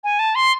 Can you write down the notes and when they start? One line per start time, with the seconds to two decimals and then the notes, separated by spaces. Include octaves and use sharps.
0.04 G#5
0.19 A5
0.35 C6